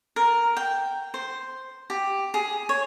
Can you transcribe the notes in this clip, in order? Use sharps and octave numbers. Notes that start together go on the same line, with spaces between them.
A#4
G5
C5
G4
G#4
C#5